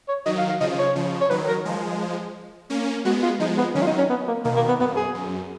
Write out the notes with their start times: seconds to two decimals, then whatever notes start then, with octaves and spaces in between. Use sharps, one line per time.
0.09 C#5
0.26 D#3 F#3 D#5
0.38 F5
0.49 F5
0.60 C#3 F3 D#5
0.79 C#5
0.96 C#3 F3
1.21 C#5
1.30 D#3 F#3 B4
1.48 A#4
1.65 F3 G#3
2.70 A#3 C#4
3.05 G#3 B3 F#4
3.23 F4
3.40 F3 G#3 D#4
3.57 B3
3.75 D#3 F#3 C#4
3.82 F4
3.87 D#4
3.98 C#4
4.10 B3
4.28 A#3
4.44 B2 D#3 A#3
4.56 A#3
4.68 B3
4.80 F#2 B3
4.97 G#4
5.15 F#2